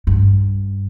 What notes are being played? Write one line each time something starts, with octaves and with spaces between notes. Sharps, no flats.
G2